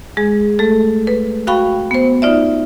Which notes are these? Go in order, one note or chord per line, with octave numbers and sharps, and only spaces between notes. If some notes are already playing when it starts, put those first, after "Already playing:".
G#3 G#4
A3 A4
B4
F#4 F5 G5 B5 C#6
B3 C5
D#4 F4 D5 E5